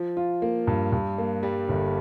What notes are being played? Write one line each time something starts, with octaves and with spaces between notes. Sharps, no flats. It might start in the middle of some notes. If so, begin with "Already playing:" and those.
Already playing: F3
F4
A#3
G2
G2
A#3
G3
G1